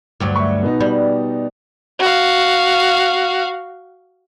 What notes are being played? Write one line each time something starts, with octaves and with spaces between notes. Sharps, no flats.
D2 G2 F#3
E5 C#6
B2 B3 D#4
G3
F#4 F5